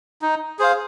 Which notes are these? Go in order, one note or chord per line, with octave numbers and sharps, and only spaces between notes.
D#4
G#4 C5 F5